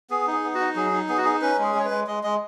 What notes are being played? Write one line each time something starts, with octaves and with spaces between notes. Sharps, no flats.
B3 G#4
D#4
G#4
B3
F#4
D#4
F#3 G#4
D#4
B3 G#4
F#4
D#4 G#4
C#4 B4
G#3 G#4
G#3 C#5
B4
G#3
G#3 D#5
G#3 D#5